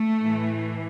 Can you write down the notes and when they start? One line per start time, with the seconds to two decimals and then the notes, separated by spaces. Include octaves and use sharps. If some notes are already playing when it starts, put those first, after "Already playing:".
Already playing: A3
0.22 A2 E3